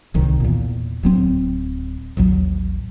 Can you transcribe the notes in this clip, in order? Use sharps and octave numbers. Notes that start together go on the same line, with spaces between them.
D1 C2 D#3
E2 A#2
D1 F#3 C4
A1 D#2 F#3